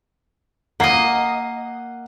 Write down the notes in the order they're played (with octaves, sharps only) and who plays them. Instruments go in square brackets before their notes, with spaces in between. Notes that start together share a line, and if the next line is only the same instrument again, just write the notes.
[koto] A#3 D#5 [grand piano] F#5 C7